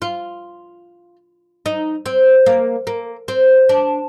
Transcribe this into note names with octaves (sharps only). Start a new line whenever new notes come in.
F4
D#4
C4
A#3
A#3
C4
D4